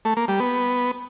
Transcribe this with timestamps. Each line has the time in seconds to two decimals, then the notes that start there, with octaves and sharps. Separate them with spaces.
0.05 A3
0.17 A#3
0.28 G3
0.40 B3